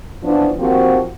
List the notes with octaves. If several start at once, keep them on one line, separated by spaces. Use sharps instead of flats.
E3 F3 B3 C#4 D4
D#3 F3 A#3 C4 F#4 G4